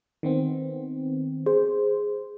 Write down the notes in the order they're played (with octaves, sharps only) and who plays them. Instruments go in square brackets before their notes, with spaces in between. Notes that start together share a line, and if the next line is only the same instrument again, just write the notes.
[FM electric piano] D#3 B3 C4
[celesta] G#4 [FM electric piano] C5